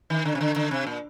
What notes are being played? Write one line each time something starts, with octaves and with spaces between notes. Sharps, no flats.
D#3
D3
C3
D3
D3
C3
A#2